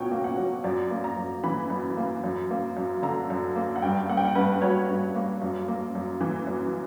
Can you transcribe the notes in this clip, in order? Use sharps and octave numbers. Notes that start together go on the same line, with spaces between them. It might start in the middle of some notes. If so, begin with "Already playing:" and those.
Already playing: C#2 B2 C#5 F#5 G5
A#3
F#5
F#3
F#2 D5
A#3
A#5
F#2
E3 B5
F#2
A#3
F#2
A#3
F#2
D3 A#5
F#2
A#3
F#5
G2 G5
A#3 F#5
G5
F#5
G2 B4
F#3 C#5
G2
A#3
F#2
A#3
F#2
E3
F#2